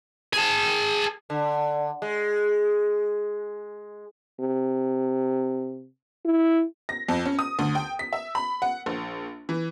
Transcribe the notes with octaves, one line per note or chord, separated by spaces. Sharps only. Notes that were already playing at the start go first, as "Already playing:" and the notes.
G#4 A5
D3
G#3
C3
E4
A#6
F2
C#4
D#6
D2
G5
B6
E5
B5
F#5
A#1
E3